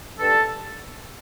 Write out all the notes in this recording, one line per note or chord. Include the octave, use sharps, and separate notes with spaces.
G2 A4